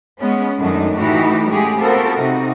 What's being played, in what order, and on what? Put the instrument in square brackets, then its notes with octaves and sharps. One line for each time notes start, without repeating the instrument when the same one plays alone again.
[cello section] G#3 B3 C#4
F#2 D#3 F#3 A3 D4 D#4
A2 E3 A3 D#4 F#4 G4
G#3 A3 C#4 G4 G#4
B3 C4 F4 F#4 A4 A#4
C3 D#4 F#4